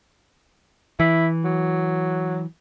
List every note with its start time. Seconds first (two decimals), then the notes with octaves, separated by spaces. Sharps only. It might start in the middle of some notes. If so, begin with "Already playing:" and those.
1.00 E3 E4
1.44 F#3